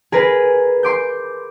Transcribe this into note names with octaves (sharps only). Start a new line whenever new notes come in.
G#4 A#4 B4
C6 D6 G6